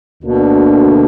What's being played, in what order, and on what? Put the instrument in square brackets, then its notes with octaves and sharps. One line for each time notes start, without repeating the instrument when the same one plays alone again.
[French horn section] D2 D3 A#3 D4 [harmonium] B2